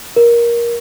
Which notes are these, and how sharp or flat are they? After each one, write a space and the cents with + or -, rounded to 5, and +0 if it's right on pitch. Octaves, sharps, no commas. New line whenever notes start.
A#4 +15